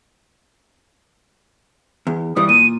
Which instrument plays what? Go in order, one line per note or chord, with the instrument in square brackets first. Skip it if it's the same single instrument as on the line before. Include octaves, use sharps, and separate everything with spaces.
[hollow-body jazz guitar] E2
[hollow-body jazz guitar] G2 E3 G3 [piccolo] D#6
[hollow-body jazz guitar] A#2 [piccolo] D#7